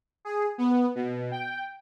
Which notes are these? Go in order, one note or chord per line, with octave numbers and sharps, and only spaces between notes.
G#4
B3
B2
G5